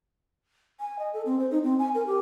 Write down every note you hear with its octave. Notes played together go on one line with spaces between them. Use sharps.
G#5
D#5
A4
C4
C5
D#4
C4
G#5
A#4
G4